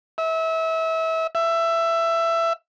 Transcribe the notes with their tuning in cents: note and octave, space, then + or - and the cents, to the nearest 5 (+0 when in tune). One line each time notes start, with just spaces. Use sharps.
E5 -30
E5 +15